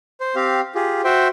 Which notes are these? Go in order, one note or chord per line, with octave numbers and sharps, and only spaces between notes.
C5
C4 G4 F5
F4 G4 G#4
F#4 C5 E5 G5